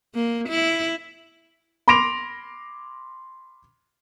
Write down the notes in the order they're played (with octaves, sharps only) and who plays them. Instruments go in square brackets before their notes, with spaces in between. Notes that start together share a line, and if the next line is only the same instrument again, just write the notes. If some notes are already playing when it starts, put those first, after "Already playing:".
[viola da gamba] A#3
E4
[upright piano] B5 C6 D6 A#6 D7 F7